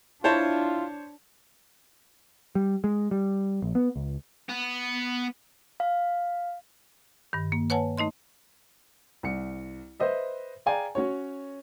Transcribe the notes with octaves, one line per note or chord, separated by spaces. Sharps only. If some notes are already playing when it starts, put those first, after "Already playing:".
D4 E4 F4 C5 C#5 A5
G3
G#3
G3
A#1
B3
C#2
B3
F5
G2 D#3
A#3
B4 C#5 F#5 G#5 A5
A3 D#4 D#5 C6
C2 C#7
B4 C5 D#5 E5
G#4 D5 F5 G5 G#5 A#5
C#4 F#4 C#5